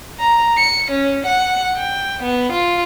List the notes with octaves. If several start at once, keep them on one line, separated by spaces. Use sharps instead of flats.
A#5
C#7
C#4
F#5
G5
B3
F4